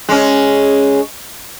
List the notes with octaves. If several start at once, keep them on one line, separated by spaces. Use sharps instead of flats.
G#3 C#4